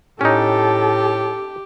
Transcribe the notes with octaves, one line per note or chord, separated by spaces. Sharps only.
A2 C#4 D#4 G4 A4